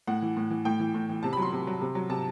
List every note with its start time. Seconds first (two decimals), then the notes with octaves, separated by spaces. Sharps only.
0.07 A2 F#5
0.22 E3
0.37 A2
0.50 E3
0.65 A2 G5
0.80 E3
0.94 A2
1.09 E3
1.23 C3 A5
1.33 B5
1.37 F#3 C6
1.52 C3
1.67 F#3
1.81 C3
1.95 F#3
2.10 C3 A5